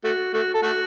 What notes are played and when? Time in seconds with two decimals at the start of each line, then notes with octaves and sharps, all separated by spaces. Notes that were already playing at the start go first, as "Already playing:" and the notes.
0.04 A3 F#4
0.34 A3 F#4
0.54 A4
0.63 A3 F#4